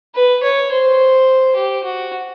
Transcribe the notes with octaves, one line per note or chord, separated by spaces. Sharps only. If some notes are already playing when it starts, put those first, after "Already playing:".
B4
C#5
C5
G4
F#4